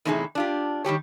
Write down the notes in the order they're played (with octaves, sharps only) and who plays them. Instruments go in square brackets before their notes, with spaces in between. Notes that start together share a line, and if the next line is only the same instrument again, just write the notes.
[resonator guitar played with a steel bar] E2 A2 C3 D#4 E4 G#4
D4 F4 G4
D#3 G3 G4 C#5